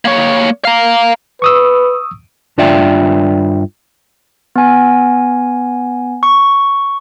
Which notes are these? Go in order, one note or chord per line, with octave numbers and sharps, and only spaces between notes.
A#3 C#5
F5 A#5
B4 C#6 D#6 E6
G2 D4 F4 D5 E5 G5
B3 G#5
C#6